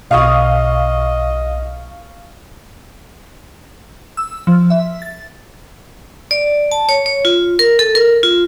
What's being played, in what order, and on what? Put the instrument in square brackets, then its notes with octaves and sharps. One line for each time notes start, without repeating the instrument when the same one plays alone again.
[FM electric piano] B1 B2 [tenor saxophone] D#5 [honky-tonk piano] F5 C#6 D#6
[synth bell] E6
F3
E5
A6
[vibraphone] D5
A5
C#5
C#5
F4
A#4
A4
A#4
F4